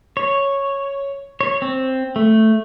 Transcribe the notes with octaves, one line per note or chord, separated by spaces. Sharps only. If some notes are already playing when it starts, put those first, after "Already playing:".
C#5
C#5
C4
A3